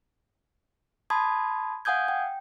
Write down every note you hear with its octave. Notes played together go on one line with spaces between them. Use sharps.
A5 B5 C6 D#6 G#6
F5 F#5 G#5 D#6 G6 G#6
G5